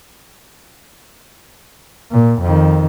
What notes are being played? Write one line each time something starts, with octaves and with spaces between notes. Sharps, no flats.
A#2
F2 D#3